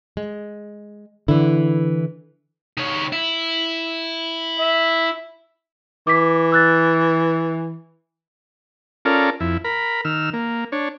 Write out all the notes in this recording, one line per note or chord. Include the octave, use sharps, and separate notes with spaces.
G#3
D3 E3 E4
D#3 C#5
E4
E5
E3 D6 B6
E6 F#6 A6
C#4 F4 A4 A#4 D5
F2 E4
A#4 B5
D#3 E6 F6
A#3
D4 C#5